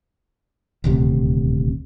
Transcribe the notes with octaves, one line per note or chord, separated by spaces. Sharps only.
D#1 D2 C3